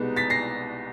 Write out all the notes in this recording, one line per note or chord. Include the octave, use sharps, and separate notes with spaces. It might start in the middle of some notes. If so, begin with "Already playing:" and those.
Already playing: C2 B2 G#3 B3 D#4
A6 B6
A#6 C7